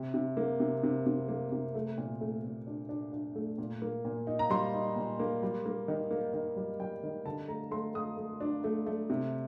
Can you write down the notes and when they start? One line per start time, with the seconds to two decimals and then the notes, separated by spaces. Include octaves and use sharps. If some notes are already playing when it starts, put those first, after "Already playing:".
Already playing: C3
0.14 C3
0.37 A#3
0.60 C3
0.83 C3
1.06 C3
1.28 A#3
1.52 C3
1.75 A3
1.98 A#2
2.21 A3
2.44 A#2
2.67 D4
2.89 D4
3.13 D4
3.35 A3
3.58 A#2
3.82 A#3
4.05 A#2
4.27 D#4
4.39 A#5
4.50 G3 C6
4.74 D#4
4.96 A#2
5.20 A#3
5.43 G3
5.66 A#3
5.88 D#3
6.11 A#3
6.34 D#3
6.56 G3
6.80 G3 G5
7.03 D#3
7.25 D3 A5
7.48 A3 A#5
7.71 A3 C6
7.94 A3 D#6
8.17 A3
8.40 D4
8.64 A3
8.86 A3
9.10 C3